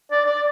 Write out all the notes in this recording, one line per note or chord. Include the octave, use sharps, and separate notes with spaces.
D5
D5